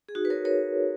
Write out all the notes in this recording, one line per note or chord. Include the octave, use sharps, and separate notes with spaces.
G#4
D#4 F#4
B4
A#4 C#5
A#4 C#5